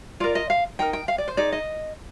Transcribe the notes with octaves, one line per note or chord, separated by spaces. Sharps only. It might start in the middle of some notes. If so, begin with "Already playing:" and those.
F4 A#4 D5
D#5
F5
D#4 A#4 G5
G5
F5
D5
C5
D#4 G#4 D5
D#5